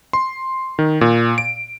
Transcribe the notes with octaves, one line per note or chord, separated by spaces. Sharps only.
C6
D#3
A#2
D7